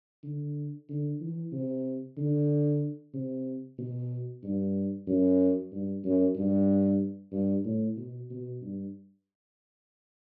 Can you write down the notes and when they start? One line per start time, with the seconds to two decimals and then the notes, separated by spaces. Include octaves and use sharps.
0.24 D3
0.89 D3
1.21 E3
1.52 C3
2.17 D3
3.14 C3
3.78 B2
4.43 G2
5.07 F#2
5.72 G2
6.04 F#2
6.35 G2
7.32 G2
7.65 A2
7.97 B2
8.30 B2
8.62 G2